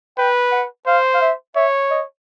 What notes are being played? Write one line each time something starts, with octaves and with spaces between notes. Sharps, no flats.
B4 G5
F#5
C5 F5
F5
E5
C#5 E5
D#5